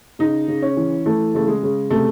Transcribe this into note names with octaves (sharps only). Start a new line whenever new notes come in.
C#3 D#4
C#3
C#4
E3
E3 A3
C#3 A3
G#3
C#3
C3 A3